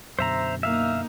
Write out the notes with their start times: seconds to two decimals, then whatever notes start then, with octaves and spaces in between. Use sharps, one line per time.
0.19 F#2 B2 D3 C5 E5 A#5
0.63 A#3 D#4 E5 F5